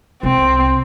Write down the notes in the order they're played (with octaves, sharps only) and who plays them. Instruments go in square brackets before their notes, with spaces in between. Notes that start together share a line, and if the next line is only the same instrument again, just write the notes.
[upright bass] C2 [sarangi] C4